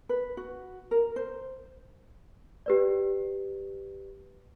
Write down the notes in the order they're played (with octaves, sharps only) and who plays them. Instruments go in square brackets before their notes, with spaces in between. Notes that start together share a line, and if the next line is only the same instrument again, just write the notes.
[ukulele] B4
F#4
A#4
C5
[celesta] G4 B4 D5